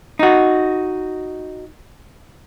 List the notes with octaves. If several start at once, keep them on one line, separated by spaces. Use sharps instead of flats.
D#4 F#4